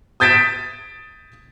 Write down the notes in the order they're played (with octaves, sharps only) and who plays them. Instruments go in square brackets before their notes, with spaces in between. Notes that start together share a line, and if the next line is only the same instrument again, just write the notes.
[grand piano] D#6 G6 A6 B6 D7 E7